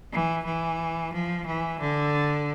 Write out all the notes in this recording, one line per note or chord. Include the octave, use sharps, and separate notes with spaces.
E3
E3
F3
E3
D3